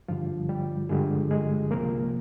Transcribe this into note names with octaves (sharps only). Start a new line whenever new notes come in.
G2 D3 F3 G3 F4
G3 G4
G2 D3 G3 G#3 G#4
G#3 G#4
C2 C3 F3 A#3 A#4